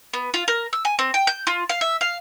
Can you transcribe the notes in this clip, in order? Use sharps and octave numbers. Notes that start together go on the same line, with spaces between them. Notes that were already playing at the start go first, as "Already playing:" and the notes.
B3
F4
A#4
E6
G#5
C4
G5
G6
F4
F5
E5
F5